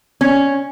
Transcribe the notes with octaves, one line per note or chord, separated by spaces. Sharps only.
C#4